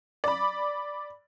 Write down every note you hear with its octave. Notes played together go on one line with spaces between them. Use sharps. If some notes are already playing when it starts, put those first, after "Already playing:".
D5 B5